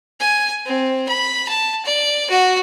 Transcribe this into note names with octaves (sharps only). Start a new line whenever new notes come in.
G#5
C4
B5
A5
D5
F#4